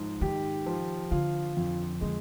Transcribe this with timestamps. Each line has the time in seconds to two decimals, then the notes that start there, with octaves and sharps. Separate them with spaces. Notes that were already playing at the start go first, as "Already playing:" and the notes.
Already playing: G#2 F3
0.21 D#3 G4
0.66 F3
1.11 D3 F4
1.57 F2
2.01 D3 G#3